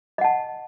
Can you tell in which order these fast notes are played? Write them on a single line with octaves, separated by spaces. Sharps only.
D#5 F#5 A5